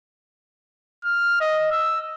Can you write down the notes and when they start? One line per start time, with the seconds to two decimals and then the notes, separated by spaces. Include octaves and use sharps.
1.05 F6
1.41 D#5
1.72 E6